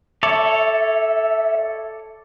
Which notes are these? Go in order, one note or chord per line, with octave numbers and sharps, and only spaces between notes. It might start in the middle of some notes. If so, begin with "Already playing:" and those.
A4 C#5 D5 E5